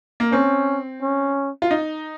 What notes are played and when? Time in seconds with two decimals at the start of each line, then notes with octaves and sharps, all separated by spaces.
0.20 A#3
0.32 C4 C#4
1.01 C#4
1.62 F4
1.71 D#4